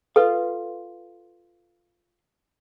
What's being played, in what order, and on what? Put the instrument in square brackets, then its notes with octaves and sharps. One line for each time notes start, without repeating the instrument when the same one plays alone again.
[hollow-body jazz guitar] F4 F5 [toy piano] A4 B4